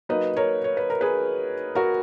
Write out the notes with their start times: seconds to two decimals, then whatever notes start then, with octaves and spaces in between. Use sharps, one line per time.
0.09 F#3 A#3 D#4 B4 D#5
0.36 A#4 C#5
0.64 C#5
0.77 B4
0.90 A#4
1.01 G#4 B4
1.75 F#4 A#4